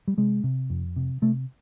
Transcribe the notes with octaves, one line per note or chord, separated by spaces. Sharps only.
G3
C3 G#3
C3
F2
C3
C3 A3